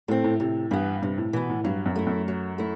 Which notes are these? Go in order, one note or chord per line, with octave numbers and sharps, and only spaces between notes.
A2 A3 C4
A2
A2 C3
G2 E3 B3
G2 C3
A2
B2 E3 B3
A2
G2 F#3
F#2
A3 E4
F#2
F#3
A3 E4